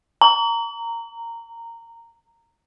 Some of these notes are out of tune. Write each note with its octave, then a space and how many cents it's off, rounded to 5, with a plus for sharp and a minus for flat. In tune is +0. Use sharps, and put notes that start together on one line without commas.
A#5 -15